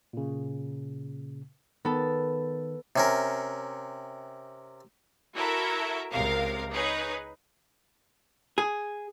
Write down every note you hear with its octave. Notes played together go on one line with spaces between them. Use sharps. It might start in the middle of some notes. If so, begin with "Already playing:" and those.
A#2 C#3
D#3 B3 A4
C3 C#4 A#4
E4 F#4 A4 A#4 E5
C#2 C3 A#4 F5
D#4 G#4 B4 C#5
G#4